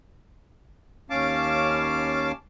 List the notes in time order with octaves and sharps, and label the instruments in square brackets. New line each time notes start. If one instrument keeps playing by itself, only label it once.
[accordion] D#2 C#4 F5 A5 D6